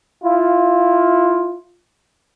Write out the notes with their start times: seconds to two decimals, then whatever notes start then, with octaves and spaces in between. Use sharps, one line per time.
0.24 E4 F4